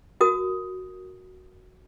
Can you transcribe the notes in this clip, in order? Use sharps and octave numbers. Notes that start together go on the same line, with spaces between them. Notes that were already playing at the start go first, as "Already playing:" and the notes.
F#4 A#4 D#6